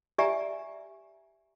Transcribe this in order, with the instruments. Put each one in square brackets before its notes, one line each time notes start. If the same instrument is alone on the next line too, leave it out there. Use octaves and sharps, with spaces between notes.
[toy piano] G4 D5 E5 G#5 A#5